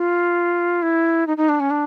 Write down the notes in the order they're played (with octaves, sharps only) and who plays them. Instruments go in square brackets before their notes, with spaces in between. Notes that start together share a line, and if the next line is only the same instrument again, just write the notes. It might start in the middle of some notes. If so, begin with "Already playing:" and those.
Already playing: [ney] F4
E4
D#4
D#4
D4
C#4
D4